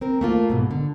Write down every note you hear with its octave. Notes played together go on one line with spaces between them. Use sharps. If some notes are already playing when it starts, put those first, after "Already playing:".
C4 A#4
A3 A#3 F4
G#2 B2
D3